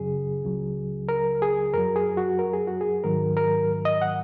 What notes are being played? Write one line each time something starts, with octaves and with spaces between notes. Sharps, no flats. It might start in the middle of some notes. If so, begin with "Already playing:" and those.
Already playing: F#2 C#3 F#3 G#4
C#2 C#3 F#3
A#4
G#4
F#2 F#3 A#4
G#4
F#4
A#4
G#4
F#4
G#4
G#2 D#3 F#3 A#4
A#4
D#5
F#5